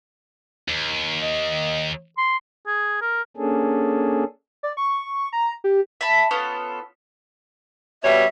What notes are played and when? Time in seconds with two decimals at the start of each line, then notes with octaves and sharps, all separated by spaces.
0.68 D#2
1.22 D#5
2.18 C6
2.67 G#4
3.01 A#4
3.37 A#3 C#4 D4 G#4 A4
4.63 D5
4.77 C#6
5.33 A#5
5.64 G4
6.01 E5 A5 B5
6.31 B3 C#4 F4 A4
8.04 B2 G3 C#5 E5